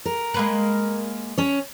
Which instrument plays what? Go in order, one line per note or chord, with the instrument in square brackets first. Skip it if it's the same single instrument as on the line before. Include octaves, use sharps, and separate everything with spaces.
[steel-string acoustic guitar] A#4
[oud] G#3 A#3 B4
[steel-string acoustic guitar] C#4 C#5